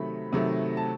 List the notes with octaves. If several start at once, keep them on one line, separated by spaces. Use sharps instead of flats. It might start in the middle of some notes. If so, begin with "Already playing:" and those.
Already playing: C3 D#3 F#3 A3 B5
C3 D#3 F#3 A3
A5